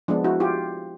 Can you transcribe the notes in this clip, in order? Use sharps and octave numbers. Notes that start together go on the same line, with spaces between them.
F3 G#3 B3 D4
E4 F#4
F4 G4